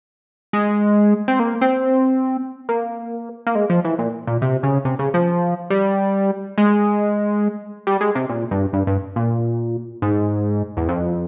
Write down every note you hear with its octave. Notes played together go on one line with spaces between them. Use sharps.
G#3
C4
A#3
C4
A#3
A#3
G#3
F3
E3
A#2
A#2
C3
C#3
C3
C#3
F3
G3
G#3
G3
G#3
C3
A#2
G2
G2
G2
A#2
G#2
E2
F2